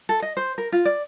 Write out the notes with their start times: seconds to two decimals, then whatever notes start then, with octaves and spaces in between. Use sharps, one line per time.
0.09 A4
0.22 D#5
0.37 C5
0.58 A#4
0.72 F4
0.85 D5